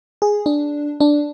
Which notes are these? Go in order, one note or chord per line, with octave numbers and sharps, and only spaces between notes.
G#4
D4
D4